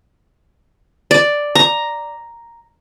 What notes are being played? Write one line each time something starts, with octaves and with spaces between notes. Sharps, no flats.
D5
A#5